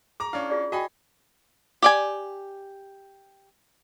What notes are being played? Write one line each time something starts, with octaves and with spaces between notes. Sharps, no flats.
G#4 A#5 D6
C#4 D4 E4 F5
F4 G#4 D5
F#4 D#5 G5 G#5 B5
G4 D5 G#5